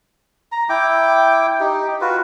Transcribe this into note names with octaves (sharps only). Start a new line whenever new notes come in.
A#5
E4 G5 D6
D#4 G4
F4 F#4 B4